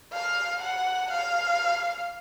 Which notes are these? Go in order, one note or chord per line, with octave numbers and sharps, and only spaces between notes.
F5
F#5
F5